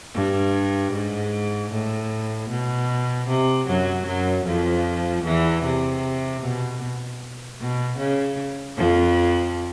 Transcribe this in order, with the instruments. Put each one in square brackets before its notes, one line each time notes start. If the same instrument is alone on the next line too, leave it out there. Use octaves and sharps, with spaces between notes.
[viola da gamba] G2
G#2
A2
B2
C3
F#2 F#3
F#2 F#3
F2 F3
E2 E3
C3
B2
B2
C#3
F2 F3